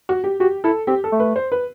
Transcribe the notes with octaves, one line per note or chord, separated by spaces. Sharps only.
F#4
G4
F#4 G4
E4 A4
C4 G4
A4
A3
B4
C5
B4